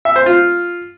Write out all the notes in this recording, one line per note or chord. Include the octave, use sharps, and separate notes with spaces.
E5
C5
F4